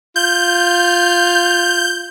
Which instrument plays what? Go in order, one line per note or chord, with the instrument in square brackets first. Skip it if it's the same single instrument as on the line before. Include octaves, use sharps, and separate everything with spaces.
[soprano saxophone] F4 [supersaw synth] G6